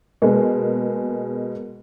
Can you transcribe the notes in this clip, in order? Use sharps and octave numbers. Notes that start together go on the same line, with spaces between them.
B2 G#3 A#3